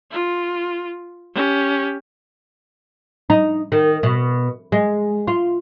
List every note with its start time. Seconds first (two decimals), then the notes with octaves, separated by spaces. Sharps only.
0.11 F4
1.34 C#4 G4
3.30 D#4
3.72 D#3
4.03 B2
4.72 G#3
5.27 F4